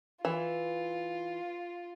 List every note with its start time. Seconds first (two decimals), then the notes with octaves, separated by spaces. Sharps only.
0.25 E3 F4